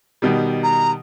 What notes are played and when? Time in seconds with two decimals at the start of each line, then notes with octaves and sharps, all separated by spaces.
0.22 B2 D#3 G3
0.63 A#5